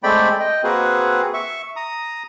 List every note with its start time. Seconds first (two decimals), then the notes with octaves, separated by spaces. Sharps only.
0.03 G#3 A3 C4 D5 G5 B5
0.39 D#5 G5
0.64 A#3 C4 F#4 G#4 B4
1.34 E5 C#6
1.76 A#5 D#6